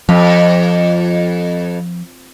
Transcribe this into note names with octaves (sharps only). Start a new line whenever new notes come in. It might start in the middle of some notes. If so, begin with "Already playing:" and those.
F2 F3